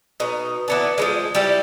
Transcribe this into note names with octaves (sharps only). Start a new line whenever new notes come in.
B2 D#4
E3 B3 D4
F3 F#3 G#3
G3 E4 G4